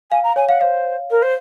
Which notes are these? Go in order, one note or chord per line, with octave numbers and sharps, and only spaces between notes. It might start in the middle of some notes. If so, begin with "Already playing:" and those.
F5 G#5
A#5
C#5 G#5
F5 F#5
C5 F5
A#4
C5